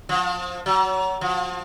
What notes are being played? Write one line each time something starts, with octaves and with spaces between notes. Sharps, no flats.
F3
F#3
F3